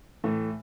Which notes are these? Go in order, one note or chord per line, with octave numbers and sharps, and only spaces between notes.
A2 E3 A3